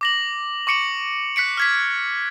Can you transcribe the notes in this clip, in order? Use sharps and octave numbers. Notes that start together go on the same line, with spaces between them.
D6 A#6 F#7
C#6 D6 C#7 D7 F#7
F#6 B6 C#7 D7
F6 G#6 B6